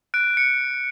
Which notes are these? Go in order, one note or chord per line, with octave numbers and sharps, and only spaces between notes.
F#6 D7
C#7